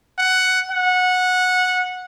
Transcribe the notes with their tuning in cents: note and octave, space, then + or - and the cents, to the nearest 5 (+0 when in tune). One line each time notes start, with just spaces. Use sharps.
F#5 +10
F#5 -15